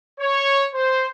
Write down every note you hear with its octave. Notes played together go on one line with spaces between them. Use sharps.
C#5
C5